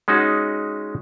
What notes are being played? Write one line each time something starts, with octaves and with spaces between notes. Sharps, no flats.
G#3 C#4 D#4 F#4